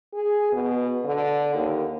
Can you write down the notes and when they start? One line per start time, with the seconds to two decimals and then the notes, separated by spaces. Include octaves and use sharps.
0.14 G#4
0.52 B2
1.05 D3
1.55 D#2